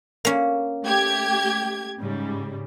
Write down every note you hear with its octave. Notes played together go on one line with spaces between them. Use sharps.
A#3 C#4
A3 G4 G#6
G#2 C#3 G3